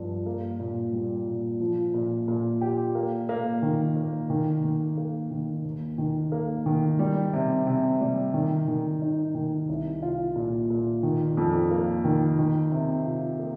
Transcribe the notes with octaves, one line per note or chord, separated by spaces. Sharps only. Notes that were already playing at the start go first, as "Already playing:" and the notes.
Already playing: G2 F3
A#3
A#2
G3
A#2
F3
A#2
A#2
G4
A#3
A#3
D#3
A#3
D#3
D#3
A#3
D#3
D#2
D#3
A#3
D#3
G3
C3
C3
G3
D#3
D#3
D#4
D#3
C2
F4
A#2
A#2
D#3
F2
A#3
D#3
D#3
C3
F4
A#3